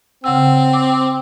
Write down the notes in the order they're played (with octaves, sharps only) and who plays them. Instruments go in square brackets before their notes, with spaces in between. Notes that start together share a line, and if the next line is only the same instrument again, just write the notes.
[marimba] C#3 F#5 E6 [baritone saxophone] C4
[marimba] D6